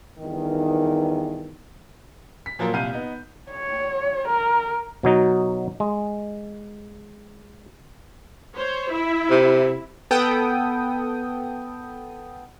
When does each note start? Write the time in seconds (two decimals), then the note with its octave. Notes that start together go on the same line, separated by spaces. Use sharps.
0.19 E2 G2 D#3
2.46 B6
2.59 A#2 F3 F#3 F4 A#4
2.73 C2 A#2 F5 G6 D#7
2.93 B3 D#4
3.51 C#5
4.28 A#4
5.03 B2 F#3 D#4
5.80 G#3
8.56 C5 C#5
8.93 E4 E5
9.30 C3
10.11 B3 A4 G5 D#6